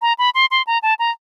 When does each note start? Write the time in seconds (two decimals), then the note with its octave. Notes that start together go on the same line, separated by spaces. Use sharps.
0.02 A#5
0.19 B5
0.35 C6
0.51 C6
0.67 A#5
0.83 A5
0.99 A#5